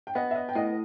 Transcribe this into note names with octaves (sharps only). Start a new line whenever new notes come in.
G5
B3 D#5 F#5
E5
D#5 F#5
G5
A2 D#5 F#5